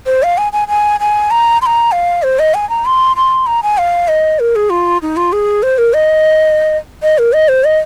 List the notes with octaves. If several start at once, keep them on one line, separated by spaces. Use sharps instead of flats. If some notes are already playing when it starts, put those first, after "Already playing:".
C5
F5
G#5
G#5
G#5
G#5
A#5
C6
A#5
F5
C5
D#5
G#5
A#5
C6
C6
A#5
G#5
F5
D#5
A#4
G#4
F4
D#4
F4
G#4
C5
A#4
D#5
D#5
A#4
D#5
C5
D#5